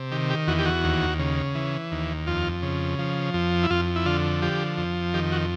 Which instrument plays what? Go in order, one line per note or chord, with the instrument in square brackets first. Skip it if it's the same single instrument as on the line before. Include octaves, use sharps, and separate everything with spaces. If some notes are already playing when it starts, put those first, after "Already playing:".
Already playing: [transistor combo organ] C3
D#3 G4
G4
E2 F#4
G4
F#4
D#2
C#3
E3
D#2
F2 F4
C#3
F3
F2
E4
F2 F4
E4
D3 F4
F3 G4
F2
D#3 G4
F#4